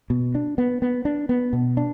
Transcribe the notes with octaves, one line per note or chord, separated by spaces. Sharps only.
B2
D4
B3
B3
D4
B3
B2
D4